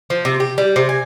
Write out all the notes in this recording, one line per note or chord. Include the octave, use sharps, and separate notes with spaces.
F3
C3
G4
G3
C3
G#5